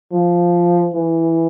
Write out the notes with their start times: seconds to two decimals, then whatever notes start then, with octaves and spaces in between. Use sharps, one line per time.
0.12 F3
0.93 E3